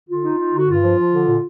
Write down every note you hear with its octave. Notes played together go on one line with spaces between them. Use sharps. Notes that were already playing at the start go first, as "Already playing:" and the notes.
D3 F4
D#4
D#4
D3 F#4
G2 F4
F3
F3
D3
A#2